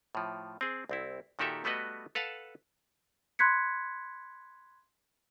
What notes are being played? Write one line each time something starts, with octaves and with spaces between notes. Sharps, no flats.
A2 F3
C4 G#4
C2 C4 E4
A#2 D#3 F#4 G4 A4 E5
G3 A3 B3 F#4 B4 D#5
A4 B4 F5 F#5 A5
B5 C6 F#6 G#6 B6 C#7